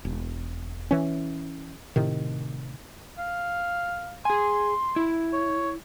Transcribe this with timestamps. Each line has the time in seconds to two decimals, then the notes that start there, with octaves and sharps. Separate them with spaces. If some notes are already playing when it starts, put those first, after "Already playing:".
0.05 E1
0.91 E3 C#4
1.96 A2 C3 D#3
3.18 F5
4.25 G#4 G#5 C6
4.96 E4
5.33 C#5